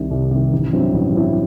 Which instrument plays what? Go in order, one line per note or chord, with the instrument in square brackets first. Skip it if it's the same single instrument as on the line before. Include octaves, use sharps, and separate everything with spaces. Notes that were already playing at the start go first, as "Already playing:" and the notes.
Already playing: [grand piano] C2 C3 D#3
C2
C3 D#3
A1
G2 F#3 C4 E4
A1
G2 F#3 C4 E4